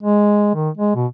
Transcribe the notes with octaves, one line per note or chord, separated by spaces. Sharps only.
G#3
D#3
G#3
B2